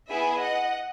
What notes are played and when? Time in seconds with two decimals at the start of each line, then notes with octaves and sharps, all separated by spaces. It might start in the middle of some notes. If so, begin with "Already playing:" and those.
0.09 B3 E4 G#4 E5 G#5
0.40 D#5 F#5